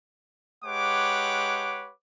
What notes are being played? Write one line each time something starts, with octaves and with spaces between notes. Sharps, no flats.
G#3 G4 B4 C#5 F#5 D6